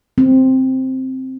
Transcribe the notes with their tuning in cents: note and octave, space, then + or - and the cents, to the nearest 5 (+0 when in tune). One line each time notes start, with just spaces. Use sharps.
C4 +0